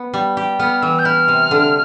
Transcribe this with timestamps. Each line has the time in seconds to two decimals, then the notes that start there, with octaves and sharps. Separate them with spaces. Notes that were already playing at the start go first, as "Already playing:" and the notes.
Already playing: B3
0.14 G3
0.37 G4
0.59 B3 F6
0.82 E3 E6
0.99 G6
1.05 E4 F6
1.28 C3
1.51 D3